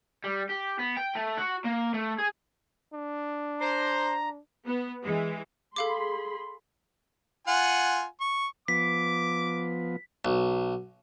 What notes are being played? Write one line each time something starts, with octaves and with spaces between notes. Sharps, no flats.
G3
G4
B3
G5
A3
F#4
A#3
A3
G#4
D4
C5 A#5
B3
E3 G#3
G#4 A4 F5 B5 C6 D6
F4 F#5 G#5
C#6
F3 B3 D6 B6
B1